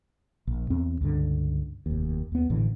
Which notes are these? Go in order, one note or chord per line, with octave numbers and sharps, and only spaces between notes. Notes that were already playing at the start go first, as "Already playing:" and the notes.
A#1
E2 C4
C#2 G2 D3
F1 D#2
D#2 B3
A1 A2 D3 E3